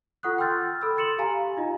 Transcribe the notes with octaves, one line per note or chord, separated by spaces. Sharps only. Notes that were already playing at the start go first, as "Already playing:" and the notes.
F4 A4 F#5 C#6 D#6 F#6
G5 C6 E6 F6 G6 A6
A4 B5 D#6 E6
C6 A6 C#7 E7 F#7
G4 F5 G#5 A#5
D#4 F4 D#5